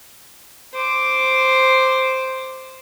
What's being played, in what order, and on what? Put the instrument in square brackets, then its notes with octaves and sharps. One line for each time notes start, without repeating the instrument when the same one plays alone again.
[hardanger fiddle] C5 D6